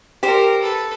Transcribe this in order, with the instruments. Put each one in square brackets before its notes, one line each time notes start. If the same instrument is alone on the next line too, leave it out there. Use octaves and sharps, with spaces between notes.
[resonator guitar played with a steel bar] G4 C5 [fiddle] A#4
[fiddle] A4 B4